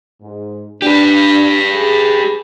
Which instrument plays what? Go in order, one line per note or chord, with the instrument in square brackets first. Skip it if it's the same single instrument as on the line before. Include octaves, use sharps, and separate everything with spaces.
[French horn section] G#2
[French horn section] D4 [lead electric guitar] G4 B4
[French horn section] G#4